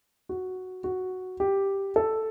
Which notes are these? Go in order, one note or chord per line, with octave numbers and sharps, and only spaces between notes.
F#4
F#4
G4
A4